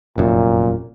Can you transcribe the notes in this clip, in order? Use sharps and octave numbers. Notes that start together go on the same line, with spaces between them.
F1 F#2 A#2